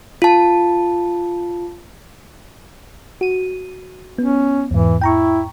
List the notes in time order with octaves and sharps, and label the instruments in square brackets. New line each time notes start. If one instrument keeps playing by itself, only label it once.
[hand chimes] F4 A5
[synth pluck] F#4 D#7
[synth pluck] B3 [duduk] C#4
[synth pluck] E2 G#2 [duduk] E3
[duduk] E4 [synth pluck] G5 A#5 C#6